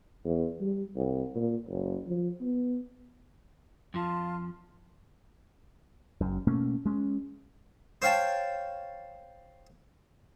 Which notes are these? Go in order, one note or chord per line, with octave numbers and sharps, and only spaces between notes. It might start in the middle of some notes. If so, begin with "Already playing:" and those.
E2
G3
C2
A#2
F#1
F3
B3
F2 F3 F4 A5 C6
F#1 F#2
B2 A3 A#3 C#4
G#3 C#4
C5 C#5 F5 G5 A5